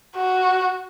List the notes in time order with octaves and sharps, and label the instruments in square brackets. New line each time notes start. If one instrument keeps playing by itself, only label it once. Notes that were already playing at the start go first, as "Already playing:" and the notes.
[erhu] F#4